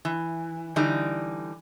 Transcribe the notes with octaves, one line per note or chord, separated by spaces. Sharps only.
E3
D3 E3 G3 D#4